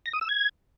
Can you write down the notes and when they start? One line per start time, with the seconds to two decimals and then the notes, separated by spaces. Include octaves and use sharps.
0.06 A#6
0.13 D#6
0.21 E6
0.29 G#6